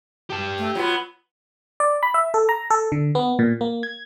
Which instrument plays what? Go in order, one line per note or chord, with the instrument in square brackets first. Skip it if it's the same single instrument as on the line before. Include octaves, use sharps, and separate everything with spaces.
[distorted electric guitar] G4 A5
[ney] A3
[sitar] F#3 B3 [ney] F4
[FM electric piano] D5
B5
E5
A4
A#5
A4
D3
B3
A#2
A#3
G#6